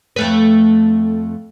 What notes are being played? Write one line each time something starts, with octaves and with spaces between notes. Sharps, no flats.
F2 A3 B4